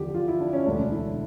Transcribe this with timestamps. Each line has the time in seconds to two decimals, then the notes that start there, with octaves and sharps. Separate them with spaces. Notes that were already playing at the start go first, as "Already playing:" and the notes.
Already playing: E2 D3 F3 G4
0.15 F4
0.28 E4
0.40 D4
0.53 C#4
0.66 E1 D2 D3 D4
0.92 E4